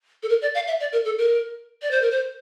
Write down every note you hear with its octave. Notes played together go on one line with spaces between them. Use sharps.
A4
A#4
D5
F5
E5
D5
A#4
A4
A#4
D5
C5
A#4
C5